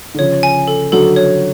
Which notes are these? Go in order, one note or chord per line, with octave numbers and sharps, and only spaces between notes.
D3
C#3 F3 C#5
G#5
A4
D3 F#3 A4
C#5